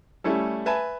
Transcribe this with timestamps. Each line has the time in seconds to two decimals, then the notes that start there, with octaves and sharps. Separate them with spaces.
0.24 G3 A3 C#4 E4 A4
0.66 B4 E5 G#5 A5 B5